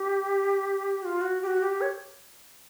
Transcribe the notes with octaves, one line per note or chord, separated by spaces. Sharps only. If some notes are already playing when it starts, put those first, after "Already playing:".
Already playing: G4
F#4
F4
F#4
G4
F#4
G4
C#5